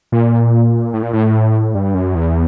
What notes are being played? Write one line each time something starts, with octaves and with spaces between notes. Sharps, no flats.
A#2
A2
A#2
A2
G2
F#2
E2